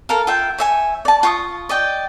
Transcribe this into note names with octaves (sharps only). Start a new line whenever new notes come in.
A4 A#4 F5
F4 E5 G5
C#5 E5 G#5
D5 A5
F4 C#6 D#6
D5 D#5 G5